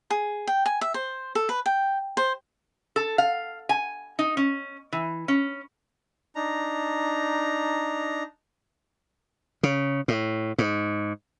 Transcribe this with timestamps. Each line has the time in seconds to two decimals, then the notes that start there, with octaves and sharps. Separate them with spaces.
0.10 G#4
0.47 G5
0.66 G#5
0.81 E5
0.94 C5
1.35 A4
1.49 B4
1.66 G5
2.17 C5
2.96 A4
3.18 F5
3.69 G#5
4.19 D#4
4.37 C#4
4.93 E3
5.28 C#4
6.35 D4 D#4 A#5
9.63 C#3
10.08 A2
10.58 G#2